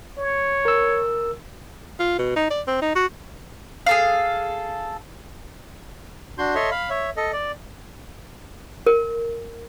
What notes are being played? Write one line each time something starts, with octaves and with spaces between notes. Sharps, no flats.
C#5
A#4 E6
F4
B2
D#4
D5
C4
D#4
F#4
G#4 A4 F5
D4 F#4 C6 G6
A4 C#5 D#5 E5 C6
F5 B5
C#5 E5
A4 D#5
D5
A#4